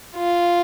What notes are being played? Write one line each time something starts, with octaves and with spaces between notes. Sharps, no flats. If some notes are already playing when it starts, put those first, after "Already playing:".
F4